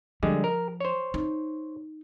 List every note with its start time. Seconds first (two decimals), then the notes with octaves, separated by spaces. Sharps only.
0.23 D3 F3 G3 G#3
0.44 A#4
0.80 C5 C#5
1.14 D#4